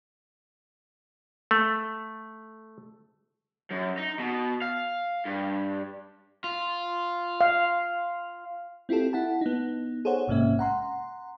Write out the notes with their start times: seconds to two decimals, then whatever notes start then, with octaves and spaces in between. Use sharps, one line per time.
1.51 A3
3.71 F#2
3.97 D#4
4.19 B2
4.62 F5
5.26 G2
6.44 F4
7.41 F5
8.89 C4 E4 F4 G4 A4
9.13 E4 F#5 A5
9.41 B3 D#4
10.05 G#4 A4 C5 C#5 F#5
10.28 A#1 G#2 C3 A#3 C#4 E5
10.59 F#5 A#5 C6